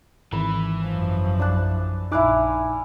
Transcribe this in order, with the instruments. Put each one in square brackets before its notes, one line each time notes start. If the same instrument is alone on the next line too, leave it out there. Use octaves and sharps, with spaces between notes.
[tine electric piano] G#1 [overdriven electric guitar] E3 [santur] B5
[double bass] F#2 F3
[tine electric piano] A#1 F#6 [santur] D4 A5
[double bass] A#1 [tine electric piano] D#4 D6 F#6 [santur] E4 F5 G#5